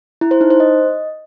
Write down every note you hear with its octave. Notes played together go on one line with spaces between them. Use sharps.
E4
C5
D#4
C5
D#5